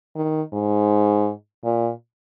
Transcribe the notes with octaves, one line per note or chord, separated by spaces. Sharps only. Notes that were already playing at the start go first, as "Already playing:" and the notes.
D#3
G#2
A#2